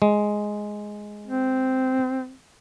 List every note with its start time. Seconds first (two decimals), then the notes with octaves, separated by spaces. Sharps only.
0.02 G#3
1.27 C4